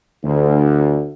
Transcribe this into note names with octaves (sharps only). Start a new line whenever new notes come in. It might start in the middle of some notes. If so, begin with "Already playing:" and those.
D2